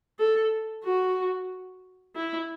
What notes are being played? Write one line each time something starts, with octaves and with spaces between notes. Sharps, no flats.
A4
F#4
E4